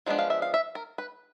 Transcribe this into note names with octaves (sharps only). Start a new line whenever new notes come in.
F3 G#3 B3 D4
F5
E5
F5
E5
A#4
B4